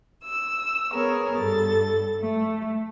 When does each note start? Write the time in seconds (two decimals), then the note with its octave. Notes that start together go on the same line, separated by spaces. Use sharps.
0.24 E6
0.90 B3 G#4 A#4 C#5
1.37 G2 A4 A6
2.19 A3